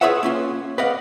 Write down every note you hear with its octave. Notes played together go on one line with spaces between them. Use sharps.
F4 G#4 B4 C#5 E5 F#5
A#3 C#4 F4
B4 D5 D#5 F5 F#5